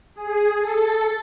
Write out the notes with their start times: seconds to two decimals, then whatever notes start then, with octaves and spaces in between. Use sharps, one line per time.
0.14 G#4
0.59 A4